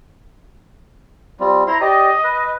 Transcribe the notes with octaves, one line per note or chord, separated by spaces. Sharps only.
G3 C4 F4
E4 C5 A#5 C6
G4 D5 D#5
B4